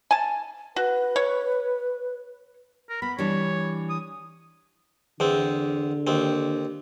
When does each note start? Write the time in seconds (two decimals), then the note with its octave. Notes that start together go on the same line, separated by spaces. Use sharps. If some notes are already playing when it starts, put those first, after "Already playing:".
0.11 G#5 A5
0.76 F#4 B4
1.16 C#5
2.90 A#4
3.02 B3 B5
3.18 E3 G3 D4 C#5
3.90 D#6
5.20 E2 D3 C4
6.07 D#2 C4